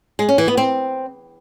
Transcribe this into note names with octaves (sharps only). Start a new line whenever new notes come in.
G#3
C#4
E3
B3
C4